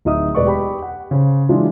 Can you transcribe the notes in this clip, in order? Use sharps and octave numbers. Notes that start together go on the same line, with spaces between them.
D1 D#4 D#5 E5 D#6
E1 B4 D5 D#5 C#6
G4 B5
F#5
C#3 C5
E3 F#3 G#3 D4 F4